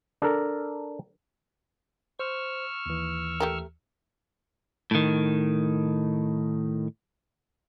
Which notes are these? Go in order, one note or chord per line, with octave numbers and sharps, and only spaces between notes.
D4 A4 A#4
C5 C#6 E6 F6
D#2 E3
A3 G4 A#4
A2 D#3